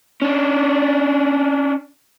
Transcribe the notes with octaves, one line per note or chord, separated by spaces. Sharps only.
C#4 D4